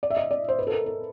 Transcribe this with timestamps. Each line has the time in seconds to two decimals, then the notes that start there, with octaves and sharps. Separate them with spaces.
0.03 D5
0.10 E5
0.17 D#5
0.31 D5
0.49 C5
0.59 B4
0.67 A4
0.72 A#4
0.86 A#4